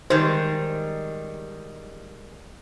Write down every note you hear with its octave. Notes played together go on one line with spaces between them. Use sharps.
D#3 G3 G#3 C5